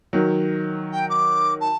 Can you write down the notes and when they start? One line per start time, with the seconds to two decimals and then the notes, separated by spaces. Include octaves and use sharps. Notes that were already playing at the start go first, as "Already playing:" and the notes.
0.13 D#3 F#3
0.92 G5
1.09 D6
1.61 A5